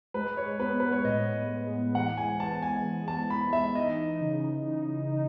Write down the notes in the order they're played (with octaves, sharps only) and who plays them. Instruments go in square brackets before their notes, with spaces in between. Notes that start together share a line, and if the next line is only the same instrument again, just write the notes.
[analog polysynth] G#3 [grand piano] B4
[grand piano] C#5
[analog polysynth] B3 [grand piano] B4
[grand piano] B4
C#5
[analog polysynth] A2 [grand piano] D#5
[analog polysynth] G#3
[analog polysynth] E3 [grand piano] F#5
[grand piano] G#5
[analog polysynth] B3 [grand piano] A5
[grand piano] G#5
[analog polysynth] E3
[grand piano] A5
[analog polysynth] E3 [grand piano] B5
[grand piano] E5
[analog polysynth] D#4 [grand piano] D#5
[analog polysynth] C#3
D#4
D#4